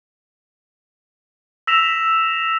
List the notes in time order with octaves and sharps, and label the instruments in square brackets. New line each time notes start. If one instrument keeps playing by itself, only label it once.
[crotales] E6 A#6 B6 E7 F7